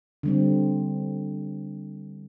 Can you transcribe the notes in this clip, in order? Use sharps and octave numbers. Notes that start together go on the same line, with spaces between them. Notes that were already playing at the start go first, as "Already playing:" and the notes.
D3 G3 C4